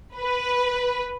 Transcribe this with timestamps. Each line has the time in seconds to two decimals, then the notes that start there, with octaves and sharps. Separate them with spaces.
0.16 B4